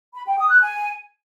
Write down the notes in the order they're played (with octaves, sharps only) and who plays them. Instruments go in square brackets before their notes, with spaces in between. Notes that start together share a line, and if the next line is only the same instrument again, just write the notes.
[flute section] B5
G5
D#6
F#6
G#5